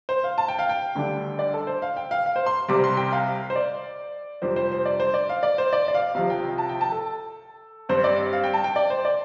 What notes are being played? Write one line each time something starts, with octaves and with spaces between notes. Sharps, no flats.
C5
F5
A5
G5
F5
G5
D2 D3 G3 D4
D5
A4
C5
F5
G5
F5
F5
C5
C6
C2 C3 G3 D6
C6
G5
F5
C5
D5
F2 C3 G3 D4 C5
C5
C5
D5
C5
D5
F5
D5
C5
D5
D5
F5
C2 C3 F3 F5
G5
A5
G5
A5
A4
G2 G3 C4 C5
D5
F5
G5
A5
G5
D5
C5
D5